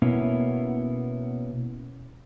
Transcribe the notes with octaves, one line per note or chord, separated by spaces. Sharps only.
B2 A#3 B3 C#4 E4